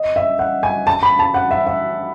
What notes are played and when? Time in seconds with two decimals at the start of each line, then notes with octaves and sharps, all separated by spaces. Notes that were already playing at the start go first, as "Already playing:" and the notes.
Already playing: D#5
0.16 E5
0.39 F#5
0.63 G#5
0.87 A5
1.03 B5
1.19 A5
1.34 F#5
1.51 E5
1.67 E5